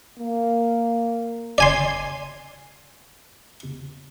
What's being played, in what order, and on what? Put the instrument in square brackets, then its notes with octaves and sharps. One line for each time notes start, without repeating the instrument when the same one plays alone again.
[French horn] A#3
[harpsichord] D5 G#5 C6